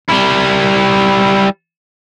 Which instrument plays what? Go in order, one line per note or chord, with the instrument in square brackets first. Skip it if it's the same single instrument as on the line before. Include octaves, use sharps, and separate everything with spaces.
[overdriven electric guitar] G3 E4